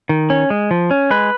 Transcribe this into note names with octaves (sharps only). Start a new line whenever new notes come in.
D#3
C#4
G#3
F3
C#4
G#3 B4